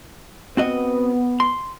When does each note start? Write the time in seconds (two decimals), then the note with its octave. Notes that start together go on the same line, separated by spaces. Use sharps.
0.57 B3 C4 F#4 D#5
1.40 C6